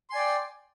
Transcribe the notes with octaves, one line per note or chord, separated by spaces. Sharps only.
D5 G5 G#5 C6